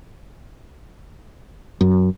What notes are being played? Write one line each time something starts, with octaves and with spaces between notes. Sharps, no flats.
F#2